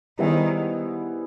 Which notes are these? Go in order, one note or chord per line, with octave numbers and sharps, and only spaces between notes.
D#3 G3 B3 E4 G#4 C5